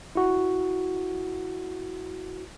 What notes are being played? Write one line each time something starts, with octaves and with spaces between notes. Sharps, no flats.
E4 F#4